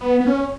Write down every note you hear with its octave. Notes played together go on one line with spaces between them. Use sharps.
B3
B3
C#4